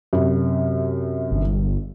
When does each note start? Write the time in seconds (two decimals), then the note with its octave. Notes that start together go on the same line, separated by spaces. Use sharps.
0.13 F#2 C3
1.31 G1